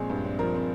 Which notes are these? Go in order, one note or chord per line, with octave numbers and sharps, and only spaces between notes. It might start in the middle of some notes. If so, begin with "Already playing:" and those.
Already playing: A#1 G#3 C4 G#4
G2
C4
F3 A#4
C4